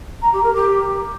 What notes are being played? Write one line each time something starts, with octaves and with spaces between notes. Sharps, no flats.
A#5
G4
A#4
G4